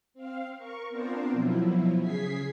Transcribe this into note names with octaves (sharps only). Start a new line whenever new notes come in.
C4 F5
A#4 C#6
B3 C4 D4 F4 A#4 C5
B2 F3 F#3 E4
C#3 G#4 G#6 B6 C7